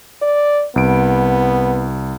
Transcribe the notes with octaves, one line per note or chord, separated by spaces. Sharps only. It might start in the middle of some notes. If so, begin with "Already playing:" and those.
D5
C2 B3 D7